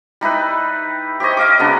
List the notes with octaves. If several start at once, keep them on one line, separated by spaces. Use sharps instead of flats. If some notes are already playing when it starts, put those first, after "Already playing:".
G3 D#4 E4 B4
G4 C5 C#5 D#5
D#5 F5 D6
C#3 F#3 B3 D4